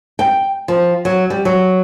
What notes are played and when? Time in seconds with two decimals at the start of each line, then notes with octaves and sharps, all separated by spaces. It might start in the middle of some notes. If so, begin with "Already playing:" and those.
0.19 G5
0.68 F3
1.05 F#3
1.30 G3
1.45 F#3